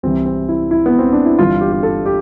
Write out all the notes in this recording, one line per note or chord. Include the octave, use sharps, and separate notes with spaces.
C2 C3 E3 C4
C4
E4
E4
B3
C4
D4
E4
G1 G2 E3 F4
G4
G4
A4
G4